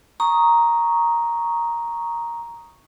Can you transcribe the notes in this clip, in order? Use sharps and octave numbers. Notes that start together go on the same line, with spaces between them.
A#5 C#6 D#6